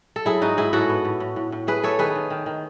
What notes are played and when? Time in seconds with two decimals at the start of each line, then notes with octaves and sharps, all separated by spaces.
0.16 A4
0.25 F#3 E4 G#4
0.41 G#2 D#4 F#4
0.57 G#2 E4 G#4
0.73 A2 F#4 A4
0.89 B3
1.05 A2
1.20 A2
1.36 A2
1.52 A2
1.67 A3 G#4 B4
1.83 A3 A4 C#5
1.99 D#3 G#4 B4
2.16 D#3
2.30 D#3
2.46 D#3